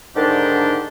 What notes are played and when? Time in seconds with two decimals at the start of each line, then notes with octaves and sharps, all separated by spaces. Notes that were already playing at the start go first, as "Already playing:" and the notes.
0.15 G#2 D3 D#3 D4 G4